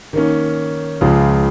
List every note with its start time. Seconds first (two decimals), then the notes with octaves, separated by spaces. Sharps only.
0.13 D#3 A#3 C#4
1.01 C#2 C#3 F3